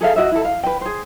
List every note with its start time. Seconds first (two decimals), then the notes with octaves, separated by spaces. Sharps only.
0.01 G#4 A4 E5 F5
0.16 F#4 D#5 E5
0.32 E4 A4
0.45 F5
0.64 B4 G5
0.81 G#4 C5